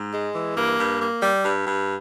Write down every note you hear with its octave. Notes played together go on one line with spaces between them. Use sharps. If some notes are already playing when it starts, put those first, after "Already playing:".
Already playing: G#2
G#3
E3
G2 A#3
G2
A#3
G3
G2
G2